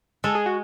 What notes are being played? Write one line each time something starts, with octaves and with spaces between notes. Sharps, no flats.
G#3 A4
G#4
F#4